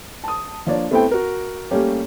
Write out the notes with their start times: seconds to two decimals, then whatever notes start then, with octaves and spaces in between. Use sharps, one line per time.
0.24 A5 D#6
0.67 F3 A#3 D4 C#5 D5
0.91 A3 B3 C4 E4 A4 G5
1.11 F#4 A#4
1.71 G3 A3 A#3 C#4 G4